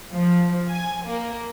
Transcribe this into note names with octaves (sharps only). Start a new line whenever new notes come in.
F3
G#5
A#3